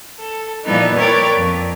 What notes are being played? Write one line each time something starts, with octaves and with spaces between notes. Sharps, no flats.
A4
A#2 E3 F3 G3 B3 D#4
A#4 B4 C#5 D5 G5
F2